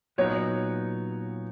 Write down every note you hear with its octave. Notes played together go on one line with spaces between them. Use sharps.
A#2 F#3 B3 D#4 C#5